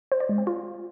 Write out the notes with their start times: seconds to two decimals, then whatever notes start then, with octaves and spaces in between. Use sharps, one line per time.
0.12 C5
0.20 D5
0.29 G#3
0.38 C4
0.47 F4